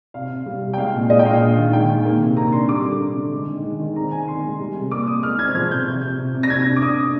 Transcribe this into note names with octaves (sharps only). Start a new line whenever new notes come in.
C3 F5
C3
G3
C3
G5
G#3 F5
A#2
G#3 D#5
G5
A#2 F5
D4
D#3
G#3 G5
D#3
A#3
C3
A#3 A#5
D4 C6
G3 D6
D3
D3
D3
G#3
D#3
G#3
D#3
C4 A#5
D#3 G#5
D#3 C6
G#3
G3
C3
A#3 D6
A#3 D#6
G#3 F6
C4 G#6
F3 G#6
F3 G6
C3
C3
C3
C3
A#6
C3 G#6
D4
D6
D4 D#6
D4